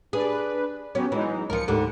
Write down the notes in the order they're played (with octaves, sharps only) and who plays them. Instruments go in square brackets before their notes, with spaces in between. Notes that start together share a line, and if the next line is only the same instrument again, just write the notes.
[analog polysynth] D4 B4 [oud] G#4
[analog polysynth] F#3 B3 G4 [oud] C#4
[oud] E3 [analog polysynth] F#3 G#3 D#4
[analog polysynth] C#2 C#7 [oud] F3 A#4
[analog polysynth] D2 [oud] G#2 D3 G3